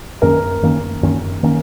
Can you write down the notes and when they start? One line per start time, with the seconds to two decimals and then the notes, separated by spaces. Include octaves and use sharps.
0.22 F#2 D#3 A#3 C#4 A#4
0.62 F#2 D#3 A#3 C#4
1.03 F#2 D#3 A#3 C#4
1.43 D#3 A#3 C#4